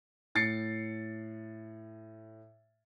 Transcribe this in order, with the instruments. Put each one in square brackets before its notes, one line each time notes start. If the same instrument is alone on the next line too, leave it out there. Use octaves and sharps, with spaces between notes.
[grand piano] A2 A6 C7 C#7